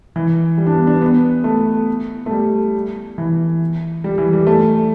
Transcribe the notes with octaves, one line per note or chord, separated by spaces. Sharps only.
E3
G3
D4
B3
D4
B3
A3
A3
G3
E3
G3
E3
G3
A3